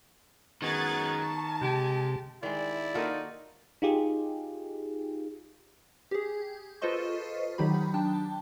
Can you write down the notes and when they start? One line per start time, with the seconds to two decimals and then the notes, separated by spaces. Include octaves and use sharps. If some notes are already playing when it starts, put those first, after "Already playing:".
0.62 F#2 D#3 G#3 B3 C#6 F#6 G#6 A6
1.19 A5
1.61 C3 G#3 G4
2.43 D#3 G#3 E4 D5
2.95 A#3 D#4 F4 F#4 A4 A#4
3.82 D#4 F4 G4 G#4
6.11 G4 G#4
6.82 F4 A4 B4 C5 D#5 C#6
7.58 D#3 F#3 D#4 G4 B5
7.94 D4 G5 A5